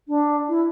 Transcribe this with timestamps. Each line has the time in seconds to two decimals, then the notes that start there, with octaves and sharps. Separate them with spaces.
0.08 D4
0.49 E4